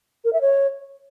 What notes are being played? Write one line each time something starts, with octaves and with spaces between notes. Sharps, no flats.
A#4
E5
C#5